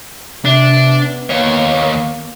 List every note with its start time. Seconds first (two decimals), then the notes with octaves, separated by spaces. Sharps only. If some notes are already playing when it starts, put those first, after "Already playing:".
0.45 C3 B3 D4
1.30 D#2 A#3 C#5